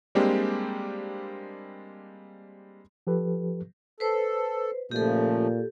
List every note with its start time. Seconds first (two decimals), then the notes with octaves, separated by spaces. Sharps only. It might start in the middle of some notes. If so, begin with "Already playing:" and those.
0.15 G3 G#3 A#3 C4 D4 G4
3.07 F3 G4 A4 B4
4.00 A4 B4 C5
4.91 A#2 C#3 F3 A3 G4 A4